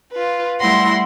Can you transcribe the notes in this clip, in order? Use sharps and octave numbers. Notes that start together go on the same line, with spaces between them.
F4 B4
G3 A3 E4 F#5 C6 A#6